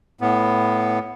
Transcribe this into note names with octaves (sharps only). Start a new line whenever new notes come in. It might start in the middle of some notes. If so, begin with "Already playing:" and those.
A2 B3